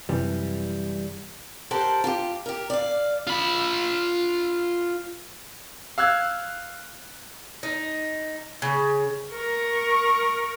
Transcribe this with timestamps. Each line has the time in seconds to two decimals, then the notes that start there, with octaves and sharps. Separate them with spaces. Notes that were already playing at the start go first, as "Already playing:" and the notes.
0.09 F#2 C3 E3 G3
1.71 G4 A4 A#4 C5 F#5 A5
2.04 F4 G4
2.46 G4 A#4
2.70 D5 F5
3.27 F4 B5
5.98 F5 E6 F#6 G#6
7.63 D#4
8.62 C#3
9.33 A#4 C#6